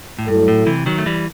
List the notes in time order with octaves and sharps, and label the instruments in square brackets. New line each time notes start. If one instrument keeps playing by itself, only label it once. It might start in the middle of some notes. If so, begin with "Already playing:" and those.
[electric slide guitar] A2
[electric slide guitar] G2 [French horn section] F#3 A3 E4 A4
[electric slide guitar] A2
C3 E3
D#3 F#3
A3
E3 G3